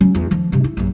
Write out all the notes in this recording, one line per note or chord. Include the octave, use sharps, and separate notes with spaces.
F#3 C#4
E2 F4
D#3 F3
G2 C3
E4
A#1 F#2